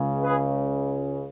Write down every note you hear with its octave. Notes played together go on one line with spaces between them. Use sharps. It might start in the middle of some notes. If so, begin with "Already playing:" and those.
Already playing: C#2 C#3
G#4 B4